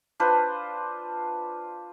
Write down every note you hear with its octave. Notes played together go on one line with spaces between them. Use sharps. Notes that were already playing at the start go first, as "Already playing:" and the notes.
D4 F4 B4 C5